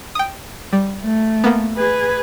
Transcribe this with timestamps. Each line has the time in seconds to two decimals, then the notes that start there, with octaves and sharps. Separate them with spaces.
0.15 G5 D#6
0.73 G3
1.03 A3
1.44 A#3 B3
1.78 G#4 B4